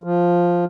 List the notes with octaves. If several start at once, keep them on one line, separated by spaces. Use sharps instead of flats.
F3